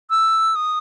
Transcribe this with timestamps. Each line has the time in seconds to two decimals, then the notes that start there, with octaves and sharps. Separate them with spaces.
0.10 E6
0.55 D#6